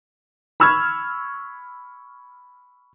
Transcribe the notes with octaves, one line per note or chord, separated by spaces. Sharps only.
B5 C#6 E6 F6 G#6